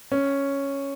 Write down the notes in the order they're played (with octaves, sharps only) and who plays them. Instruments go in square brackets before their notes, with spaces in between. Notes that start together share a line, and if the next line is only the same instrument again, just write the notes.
[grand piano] C#4